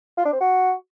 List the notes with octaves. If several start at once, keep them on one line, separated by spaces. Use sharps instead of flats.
F4
D4
C4
F#4